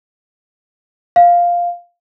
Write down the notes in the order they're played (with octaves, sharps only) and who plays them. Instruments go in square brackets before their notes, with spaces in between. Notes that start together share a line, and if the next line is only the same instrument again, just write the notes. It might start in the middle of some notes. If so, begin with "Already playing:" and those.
[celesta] F5